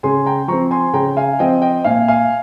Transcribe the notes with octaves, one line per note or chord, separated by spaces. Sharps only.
C#3 G#5 C6
G5 A#5
F3 C4 A#5 C#6
G#5 C6
C#3 G5 A#5
F5 G#5
F3 C4 D#5 G5
D#5 G5
A#2 F5 G#5
F5 G#5